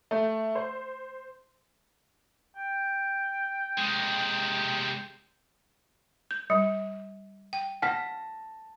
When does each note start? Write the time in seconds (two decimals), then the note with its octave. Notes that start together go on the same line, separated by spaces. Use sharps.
0.11 A3
0.55 C5
2.57 G5
3.78 C3 G#3
6.31 G6
6.50 G3
7.53 G5
7.82 F#5 A5 F6 A#6 B6